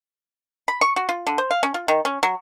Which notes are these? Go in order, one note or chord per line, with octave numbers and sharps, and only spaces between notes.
B5
C#6
F#4
F4
D3
C5
F5
C#4
F4
D#3
C#4
F#3